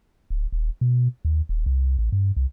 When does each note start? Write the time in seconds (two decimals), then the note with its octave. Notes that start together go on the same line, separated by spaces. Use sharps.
0.30 D1
0.52 D#1
0.81 B2
1.25 D#2
1.49 D#1
1.66 C2
1.99 A1
2.12 G2
2.36 C2